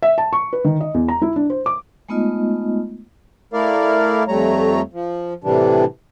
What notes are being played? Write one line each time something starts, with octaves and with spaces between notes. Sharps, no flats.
E5
A5
C#6
B4
D#3
D#5
E2
A#5
E4
D4
C5
D6
G#3 A3 B3 D#4 F4 D#5
A3 E4 A#4 D5 F5
F2 G3 A3 C#5 A#5
F3
A2 C3 E3 G3 D4